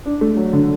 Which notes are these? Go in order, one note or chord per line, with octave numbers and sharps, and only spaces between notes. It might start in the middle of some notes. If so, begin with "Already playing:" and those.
D4
A3
F#3
D3